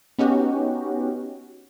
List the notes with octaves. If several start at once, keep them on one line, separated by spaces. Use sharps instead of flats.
B3 C#4 D#4 F#4 G4